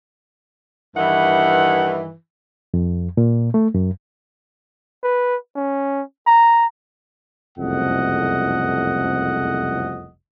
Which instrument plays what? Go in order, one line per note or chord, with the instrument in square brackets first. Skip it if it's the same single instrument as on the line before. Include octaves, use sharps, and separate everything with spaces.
[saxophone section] G2 D#3 E3 [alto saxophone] F#5
[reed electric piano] F2
A#2
A3
F#2
[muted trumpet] B4
C#4
A#5
[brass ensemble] F#1 C2 F2 A3 D#5 F#5